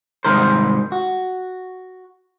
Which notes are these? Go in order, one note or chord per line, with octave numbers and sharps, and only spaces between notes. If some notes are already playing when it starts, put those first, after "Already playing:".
C2 G#2 D#3 A#4 C5
F#4